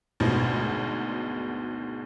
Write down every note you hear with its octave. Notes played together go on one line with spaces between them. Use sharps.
G#1 D2 G#2 B2